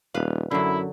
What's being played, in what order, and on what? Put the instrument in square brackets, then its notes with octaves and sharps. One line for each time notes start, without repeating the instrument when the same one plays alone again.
[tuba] D#1 [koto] B4 F5
[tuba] F#2 [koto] D3 F#3 [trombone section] E4